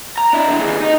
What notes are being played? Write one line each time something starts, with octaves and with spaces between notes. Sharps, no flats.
A#5
D4 E4
F2 D3
D#2 G#4
D#4